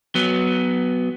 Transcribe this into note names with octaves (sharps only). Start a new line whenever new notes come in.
F#3 B3